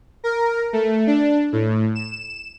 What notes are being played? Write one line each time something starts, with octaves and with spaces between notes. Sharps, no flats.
A#4
A3
D4
A2
E7